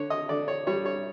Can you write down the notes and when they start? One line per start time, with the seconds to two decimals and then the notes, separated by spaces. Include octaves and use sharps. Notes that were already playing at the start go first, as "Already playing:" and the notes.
Already playing: D3 C#5
0.10 D#5
0.29 D3 D5
0.48 C#5
0.67 G3 C#5
0.86 C#5